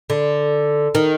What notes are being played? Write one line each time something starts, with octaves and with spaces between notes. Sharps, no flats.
D3
D#3